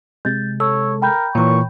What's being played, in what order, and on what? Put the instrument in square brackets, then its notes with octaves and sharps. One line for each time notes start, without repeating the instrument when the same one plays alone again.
[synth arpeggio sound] C3 G#3 [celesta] G6 A6
[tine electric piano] A4 [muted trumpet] C#5 [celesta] E6
[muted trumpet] A#4 [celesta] G5 B5 G6
[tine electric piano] A#2 E3 [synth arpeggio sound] A#4 C#5 [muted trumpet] C#6